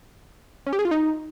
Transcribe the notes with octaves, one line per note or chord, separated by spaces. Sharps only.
C#4
G4
G#4
F4
D#4